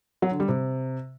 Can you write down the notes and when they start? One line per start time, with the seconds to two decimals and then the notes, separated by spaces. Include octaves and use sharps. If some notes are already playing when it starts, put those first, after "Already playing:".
0.22 F#3
0.31 D3
0.40 G3
0.49 C3